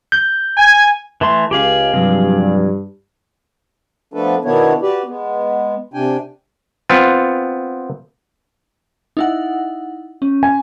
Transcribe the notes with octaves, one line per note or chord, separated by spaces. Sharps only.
G6
G#5
E3 A3 C6
C#2 G4 G#4 F5
G2 C3 F3 F#3
F3 A3 B3 D4 A4 B4
B2 D#3 B3 D4 E4 C#5
F#4 G4 B4 D5
G#3 B3
C3 D4 G5 G#5
B3 C4 F4
D#4 E4 F#5
C#4
G#5